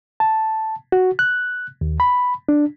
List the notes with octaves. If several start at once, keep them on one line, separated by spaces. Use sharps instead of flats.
A5
F#4
F#6
D#2
B5
D4